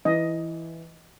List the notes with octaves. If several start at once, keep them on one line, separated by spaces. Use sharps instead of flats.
E3 D#5